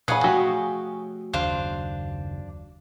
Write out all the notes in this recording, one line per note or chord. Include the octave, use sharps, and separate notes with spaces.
A#2 E3 G#4 C#5 F5 F#5 B5 D#6
F3 A3 F#4 G4
F#1 D#2 D4 C5 F5 F#6